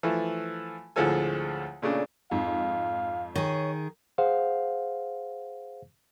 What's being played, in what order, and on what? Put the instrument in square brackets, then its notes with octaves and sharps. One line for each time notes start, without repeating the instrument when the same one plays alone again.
[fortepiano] E3 F3 A3
D2 A2 F3 G#3 A4 G#5
A#2 C#3 A3 D4
[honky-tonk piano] F2 G#2 [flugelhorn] F5
[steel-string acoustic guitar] D#3 G#4 [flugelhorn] C#5
[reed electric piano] G#4 C5 F5 F#5